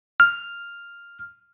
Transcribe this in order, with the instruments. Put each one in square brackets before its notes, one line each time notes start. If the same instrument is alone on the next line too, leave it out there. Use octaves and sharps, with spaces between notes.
[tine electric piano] F6